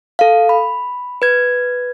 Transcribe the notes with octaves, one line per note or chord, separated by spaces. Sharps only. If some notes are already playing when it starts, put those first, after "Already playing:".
A4 F5
B5
B4 G#6